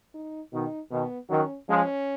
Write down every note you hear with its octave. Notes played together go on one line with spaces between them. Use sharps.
D#4
B2 D#3 D#4
B2 D#3 B3
D#3 F#3 C#4
F3 G#3 C#4